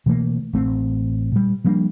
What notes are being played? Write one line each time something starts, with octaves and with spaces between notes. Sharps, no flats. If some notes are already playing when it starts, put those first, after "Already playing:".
B2 E3 A3 A#3
A1 A3 C4
A#2 G3
F3 G3 A#3 D4